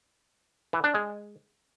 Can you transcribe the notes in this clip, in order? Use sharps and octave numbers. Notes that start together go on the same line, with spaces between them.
E3
D4
G#3